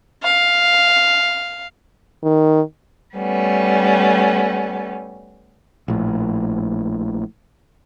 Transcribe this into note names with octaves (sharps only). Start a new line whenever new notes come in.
F5
D#3
G3 A3 B3 C#4
A#1 A2